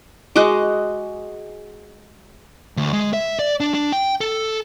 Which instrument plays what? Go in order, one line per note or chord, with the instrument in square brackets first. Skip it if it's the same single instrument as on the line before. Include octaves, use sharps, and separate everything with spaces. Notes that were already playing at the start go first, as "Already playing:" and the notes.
[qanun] G#3 F#4 D#5 D6
[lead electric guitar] D2
G#3
E5
D5
D4
D4
G5
A4